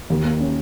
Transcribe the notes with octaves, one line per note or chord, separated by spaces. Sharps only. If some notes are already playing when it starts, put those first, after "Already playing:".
D#2
A#3
C#4